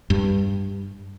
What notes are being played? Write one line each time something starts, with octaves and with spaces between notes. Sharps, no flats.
G2